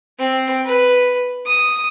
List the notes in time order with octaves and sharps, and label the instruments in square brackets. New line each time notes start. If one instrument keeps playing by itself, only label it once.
[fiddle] C4
B4
D#6